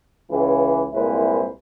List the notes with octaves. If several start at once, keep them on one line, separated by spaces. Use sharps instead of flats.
C#2 E3
C2 A#2 G#3 E4 B4 C5